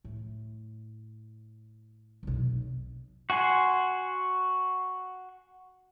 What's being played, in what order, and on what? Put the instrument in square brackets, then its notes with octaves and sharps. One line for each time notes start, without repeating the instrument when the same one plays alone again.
[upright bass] A2
F1 B1
[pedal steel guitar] F#4 F#5 G#5 C6